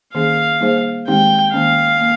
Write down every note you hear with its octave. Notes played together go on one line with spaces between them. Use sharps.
D#3 A#3 C#4 G#4 F5
G3 A#3 D#4 G#4 C5
D#3 G#3 C4 D#4 G4 G5
D#3 A#3 C#4 F5
A#3